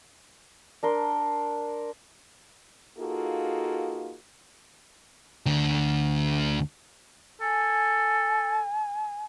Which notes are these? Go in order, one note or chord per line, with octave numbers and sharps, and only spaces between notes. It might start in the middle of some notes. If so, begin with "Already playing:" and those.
D4 A#4 C6
A#3 D#4 F4 F#4 G#4 A4
D2 D3
A4 G#5